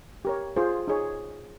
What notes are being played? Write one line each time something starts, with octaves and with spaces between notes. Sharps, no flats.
G4 A#4 C#5
F4 G#4 C5
D#4 G#4 C#5